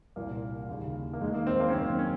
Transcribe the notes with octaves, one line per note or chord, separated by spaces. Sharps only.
C2 A#2 A#3
D#2 C#3
A#3
D#2 D#3 G#3
A#3
C4
A#3
C#4
F#2 D#3 C4
C#4